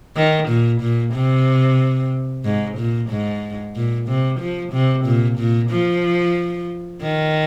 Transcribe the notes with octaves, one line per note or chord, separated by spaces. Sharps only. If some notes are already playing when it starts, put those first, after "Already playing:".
D#3
A#2
A#2
C3
G#2
A#2
G#2
A#2
C3
F3
C3
A#2
A#2
F3
D#3